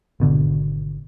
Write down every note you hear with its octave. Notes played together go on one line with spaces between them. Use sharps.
G#1 B2 D3